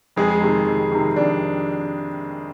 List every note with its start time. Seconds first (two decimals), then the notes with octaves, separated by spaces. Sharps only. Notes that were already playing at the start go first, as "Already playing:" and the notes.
0.16 F2 G#3 G#4
0.41 C3 D#3
0.66 F2
0.92 C3 D#3
1.16 F2 D4